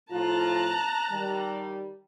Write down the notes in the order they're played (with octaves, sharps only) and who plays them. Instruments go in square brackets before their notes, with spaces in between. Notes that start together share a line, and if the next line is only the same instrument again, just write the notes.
[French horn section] A2 F3 F4 [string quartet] A5 A#5 F#6
[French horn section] D#3 G3